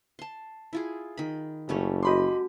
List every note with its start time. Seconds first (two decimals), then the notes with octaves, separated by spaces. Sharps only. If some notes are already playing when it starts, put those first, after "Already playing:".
0.19 A5 C6
0.73 E4 F4 G#4
1.17 D#3 B5
1.69 F#1 G3 A3 C#4
2.03 F#4 D#5 B5 C6 D6